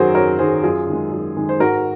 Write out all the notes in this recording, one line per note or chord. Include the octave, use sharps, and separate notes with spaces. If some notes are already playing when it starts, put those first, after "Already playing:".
Already playing: F#2 D#3 F#3 F#4 G#4 A#4 C5
F#2 A#4 C#5
D#3 F#3 G#4 C5
F#2 F4 G#4
D#3 G#3
F#2
D#3 G#3
C5
G#2 F#4 A#4